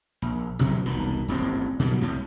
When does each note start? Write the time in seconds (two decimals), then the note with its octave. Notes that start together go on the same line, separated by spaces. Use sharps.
0.22 A#1
0.59 A1 G2 B2 F#3
0.86 E1 C2 B2 D#3
1.28 D#1 A1 G#2 C4
1.80 B2 D#3 F#3 G3
2.01 C2 A2 C3